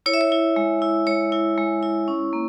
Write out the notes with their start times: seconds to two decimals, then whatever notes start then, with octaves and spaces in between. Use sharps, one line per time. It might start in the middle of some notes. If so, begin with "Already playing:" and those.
0.06 E4 C#5
0.14 E5
0.21 C#5
0.32 E4
0.56 G#3
0.82 E4
1.07 G#3 C#5
1.32 E4
1.58 G#3
1.83 E4
2.08 C#4
2.33 A#3